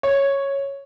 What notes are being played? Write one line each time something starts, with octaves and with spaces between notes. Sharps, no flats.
C#5